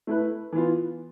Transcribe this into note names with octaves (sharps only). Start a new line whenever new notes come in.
A3 E4 B4
E3 B3 F4